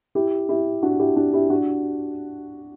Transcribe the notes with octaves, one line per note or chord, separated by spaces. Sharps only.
E4 G4
E4 G4
D4 F#4
E4 G4
D4 F#4
E4 G4
D4 F#4